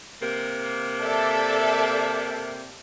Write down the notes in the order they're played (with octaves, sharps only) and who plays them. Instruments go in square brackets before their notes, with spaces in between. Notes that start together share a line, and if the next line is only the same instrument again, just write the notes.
[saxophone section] C3 A#3
[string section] A4 D5 E5